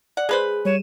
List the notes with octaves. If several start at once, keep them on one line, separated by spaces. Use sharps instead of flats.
D5 F#5
G#3 G#4 B4 C5
G3 C#5 D#7 E7